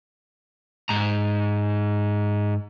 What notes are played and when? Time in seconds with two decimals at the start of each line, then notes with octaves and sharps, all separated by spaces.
0.89 G#2 A#5